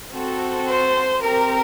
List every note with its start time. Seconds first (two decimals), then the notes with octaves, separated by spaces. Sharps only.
0.12 C4 F#4 A4
0.67 C5
1.22 C4 G4 A#4